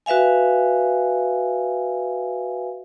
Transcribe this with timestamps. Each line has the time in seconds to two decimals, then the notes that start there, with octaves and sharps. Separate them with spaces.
0.06 F#4 B4 E5 F5 G#5